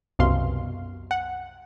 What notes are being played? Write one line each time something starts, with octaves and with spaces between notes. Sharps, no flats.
C2 F#2 B2 F5 C6
F#5